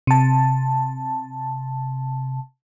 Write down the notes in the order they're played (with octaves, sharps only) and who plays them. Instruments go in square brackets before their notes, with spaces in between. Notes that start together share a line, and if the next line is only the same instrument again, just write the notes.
[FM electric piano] C3 A5